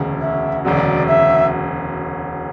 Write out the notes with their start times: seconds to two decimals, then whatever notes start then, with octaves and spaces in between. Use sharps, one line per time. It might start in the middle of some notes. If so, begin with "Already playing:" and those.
Already playing: E1 D2 C#3
0.21 E5
0.65 E1 D2 C#3 F#3 D5
1.07 E5